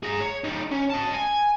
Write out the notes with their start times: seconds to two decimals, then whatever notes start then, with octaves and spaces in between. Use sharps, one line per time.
0.03 G#4 A#5
0.21 C#5
0.44 G3 D#4
0.71 C#4
0.90 D#5 A5
1.14 G#5